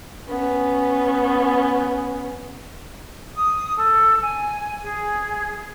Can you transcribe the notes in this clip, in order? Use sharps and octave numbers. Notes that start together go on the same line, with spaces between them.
B3 C#4
D#6
A4
G#5
G#4